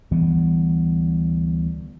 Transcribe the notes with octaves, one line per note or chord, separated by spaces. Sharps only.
D2 E3 G3 B3